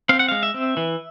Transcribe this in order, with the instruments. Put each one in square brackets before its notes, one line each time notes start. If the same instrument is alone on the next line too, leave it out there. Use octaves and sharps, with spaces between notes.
[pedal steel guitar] C4 F5
F#5
G#3 F5
E5
C4
E3